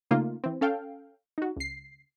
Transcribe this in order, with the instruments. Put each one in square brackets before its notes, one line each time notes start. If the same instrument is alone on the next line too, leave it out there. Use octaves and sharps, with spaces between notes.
[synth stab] C#3 A3 A#3 D#4 F4
E3 C4
C#4 A4 F5 G5
D#4 F#4
C#2 C7